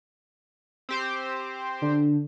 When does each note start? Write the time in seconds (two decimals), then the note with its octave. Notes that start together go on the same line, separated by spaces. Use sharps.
0.89 C4 G4 C5
1.82 D3